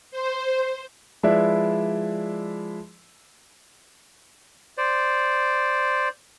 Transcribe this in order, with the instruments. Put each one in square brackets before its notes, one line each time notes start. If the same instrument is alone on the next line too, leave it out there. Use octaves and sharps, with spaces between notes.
[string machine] C5
[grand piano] F3 G#3 E4 B4 D5 E5
[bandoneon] C5 D5